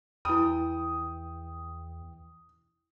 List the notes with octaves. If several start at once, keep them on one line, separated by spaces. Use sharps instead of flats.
E2 E3 E4 G5 B5 D#6